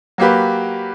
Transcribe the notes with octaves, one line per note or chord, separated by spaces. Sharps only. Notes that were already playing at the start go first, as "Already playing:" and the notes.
F#3 A#3 G4 B4